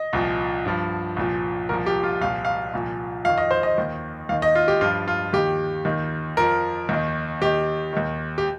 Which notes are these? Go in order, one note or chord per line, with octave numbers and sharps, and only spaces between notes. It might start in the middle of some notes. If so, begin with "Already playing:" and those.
Already playing: D#5
C2 A#2 F3
G2 F3
C2 A#2 F3
C2 A#2 F3 A#4
G4
F4
C2 A#2 F3 F5
F5
C2 A#2 F3
F2 D#3 F5
D#5
C5
D#5
D#2 D#3
D#2 D#3 F5
D#5
F4
G4
G2 F3 F4
F4
D#2 D#3 G4
D#2 D#3
F2 F3 A#4
D#2 D#3
D#2 D#3 G4
D#2 D#3
G4